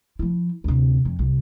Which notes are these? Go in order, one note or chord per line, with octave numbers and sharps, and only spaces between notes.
F3 E4
D2 C3
F2
C2